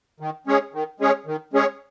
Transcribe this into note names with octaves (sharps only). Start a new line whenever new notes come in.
D#3
G#3 C#4 G#4 C#5
D#3
G#3 C#4 G#4 C#5
D#3
G#3 C#4 G#4 C#5